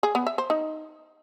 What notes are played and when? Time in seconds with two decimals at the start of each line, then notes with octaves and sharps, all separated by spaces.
0.03 G#4
0.15 B3
0.27 E5
0.38 C5
0.50 D#4